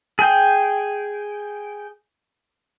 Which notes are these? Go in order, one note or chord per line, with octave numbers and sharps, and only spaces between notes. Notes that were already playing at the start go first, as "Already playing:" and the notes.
G#4 G5